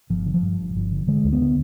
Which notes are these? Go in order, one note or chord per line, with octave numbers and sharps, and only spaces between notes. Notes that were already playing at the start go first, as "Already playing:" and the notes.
G1 F3
D3
F3
G2
G1
G1
D3
D3 G#3
D2
B3
D3